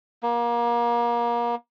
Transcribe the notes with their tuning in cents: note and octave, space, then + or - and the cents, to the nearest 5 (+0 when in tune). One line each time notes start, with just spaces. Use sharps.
A#3 +30